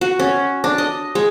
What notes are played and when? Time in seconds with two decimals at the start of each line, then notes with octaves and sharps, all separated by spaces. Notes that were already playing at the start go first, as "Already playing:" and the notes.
0.01 F#4
0.20 C#4
0.64 D4
0.78 D#5
1.15 G#3